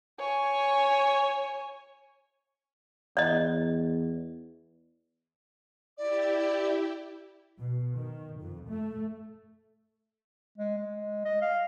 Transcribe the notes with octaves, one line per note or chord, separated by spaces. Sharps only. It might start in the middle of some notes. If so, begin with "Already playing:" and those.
C#5 G#5
E2 D5 D#5
E4 G4 D5
B2
D#3
F2
A3
G#3
G#3
D#5
F5